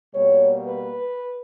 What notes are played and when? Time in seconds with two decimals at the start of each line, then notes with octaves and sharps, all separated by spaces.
0.13 B2 G3 A#3 C#5
0.65 B4